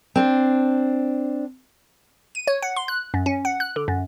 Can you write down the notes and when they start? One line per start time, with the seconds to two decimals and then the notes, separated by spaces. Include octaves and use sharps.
0.15 C4 D4
2.35 D#7
2.47 C#5
2.63 F#5
2.76 C6
2.88 F#6
3.14 F#2
3.26 C#4
3.45 F#5
3.60 F#6
3.76 D3
3.88 F#2